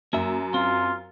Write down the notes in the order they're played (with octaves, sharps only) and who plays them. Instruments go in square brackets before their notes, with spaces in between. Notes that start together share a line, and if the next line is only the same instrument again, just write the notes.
[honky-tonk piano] F#2 [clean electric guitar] A#3 E5
[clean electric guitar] C4 [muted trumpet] F4